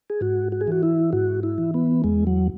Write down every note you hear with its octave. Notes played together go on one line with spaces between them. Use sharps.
G#4
G#2 F#4
F#4
G#4
E3 F#4
E4
G#2 F#4
E4
E3
B3
E2 G#3
F#3